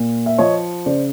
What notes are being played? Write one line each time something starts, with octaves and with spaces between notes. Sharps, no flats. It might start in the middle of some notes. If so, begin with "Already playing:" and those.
Already playing: A#2
E5
F3 C#5 D#5
C#3 C5 D5